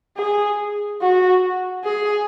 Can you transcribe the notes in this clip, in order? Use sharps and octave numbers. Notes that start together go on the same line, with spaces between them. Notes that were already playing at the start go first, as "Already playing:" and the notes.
G#4
F#4
G#4